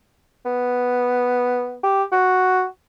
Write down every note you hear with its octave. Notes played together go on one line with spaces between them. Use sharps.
B3
G4
F#4